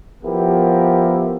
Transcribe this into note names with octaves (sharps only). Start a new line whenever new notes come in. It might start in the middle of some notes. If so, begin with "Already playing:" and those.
F3 B3 E4 G4 A#4